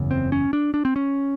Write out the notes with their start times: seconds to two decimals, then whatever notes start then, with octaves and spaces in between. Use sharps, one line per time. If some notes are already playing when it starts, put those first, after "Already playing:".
Already playing: F#1 E2 C#3
0.11 C4
0.32 C#4
0.53 D4
0.74 D4
0.85 C4
0.96 C#4